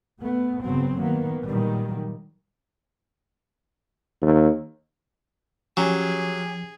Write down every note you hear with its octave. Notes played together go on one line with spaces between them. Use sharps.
A3 B3
G1 C#3 F#3 B3 C4
D#3 A#3 B3
A#2 D#3 F#3 G3
D#2
F3 F#3 C#4 G4 G#4 G#5